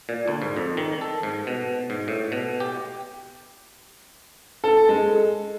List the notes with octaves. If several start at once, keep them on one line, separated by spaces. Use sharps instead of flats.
A#2
D2
G#2
F2
D#3
A4
G#2
B2
G#2
A2
B2
G4
A4
G#3